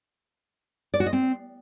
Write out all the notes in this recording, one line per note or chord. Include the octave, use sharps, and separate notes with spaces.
D5
F#4
D#5
C4